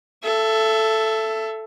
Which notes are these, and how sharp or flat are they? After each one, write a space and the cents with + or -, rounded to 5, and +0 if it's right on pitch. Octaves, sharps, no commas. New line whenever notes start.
A4 +0 E5 +25